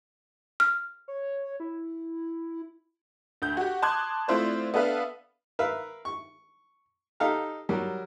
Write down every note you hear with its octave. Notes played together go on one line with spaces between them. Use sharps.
F6
C#5
E4
D2 G6
F#4 G4
A5 C6 D6 D#6 F#6 G#6
A3 C4 E4 F4 C5 D5
B3 D4 A4 B4 E5 F5
A#4 B4 E5 F5
C#6
D#4 G4 A4 F5 A#5
F#3 G3 A#4